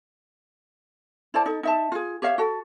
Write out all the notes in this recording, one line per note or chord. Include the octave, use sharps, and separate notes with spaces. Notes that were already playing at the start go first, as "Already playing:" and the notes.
E4 C5 D5 A5
D#4 A4
D#4 E5 A5
F4 G#4
G4 C#5 E5 F5
F#4 A4